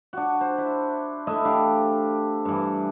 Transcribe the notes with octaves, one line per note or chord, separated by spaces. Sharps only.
D4 F#4
C5
E4
A3 E4 D#5 E5
D4 G4 F5 D6
G2 E3